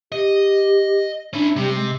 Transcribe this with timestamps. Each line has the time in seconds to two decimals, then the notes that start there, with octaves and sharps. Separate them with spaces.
0.12 G4 D#5
1.33 C#4 D4 E4
1.56 C3 G3
1.76 G#3